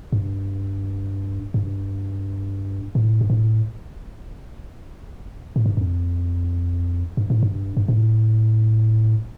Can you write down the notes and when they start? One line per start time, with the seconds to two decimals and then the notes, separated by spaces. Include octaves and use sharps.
0.13 G2
1.54 G2
2.95 A2
3.21 G2
3.30 A2
5.56 A2
5.66 G2
5.77 F2
7.17 G2
7.30 A2
7.43 G2
7.77 G2
7.88 A2